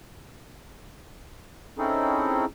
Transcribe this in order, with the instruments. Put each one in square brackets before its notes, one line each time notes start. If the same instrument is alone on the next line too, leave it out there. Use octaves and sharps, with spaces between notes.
[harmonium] C4 C#4 D#4 E4 G#4 A4